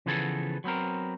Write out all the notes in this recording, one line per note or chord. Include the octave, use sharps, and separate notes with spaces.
C#3 E3 F3 B3 G#4 A4
F#3 B3 C4 A#4